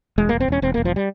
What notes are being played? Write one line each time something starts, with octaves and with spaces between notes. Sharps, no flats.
E1 G#3
E1 A#3
C4
E1 C#4
E1 C4
E1 A#3
F3
G3